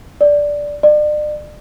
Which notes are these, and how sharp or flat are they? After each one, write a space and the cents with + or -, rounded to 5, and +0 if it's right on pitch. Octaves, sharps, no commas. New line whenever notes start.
D5 -5
D5 +40